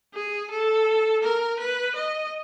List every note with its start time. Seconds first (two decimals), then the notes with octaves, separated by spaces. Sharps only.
0.14 G#4
0.50 A4
1.22 A#4
1.59 B4
1.96 D#5